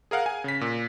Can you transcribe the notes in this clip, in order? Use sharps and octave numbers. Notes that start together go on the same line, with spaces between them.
G#4 A#4 F5 F#5
G#5
C#3 B6
A#2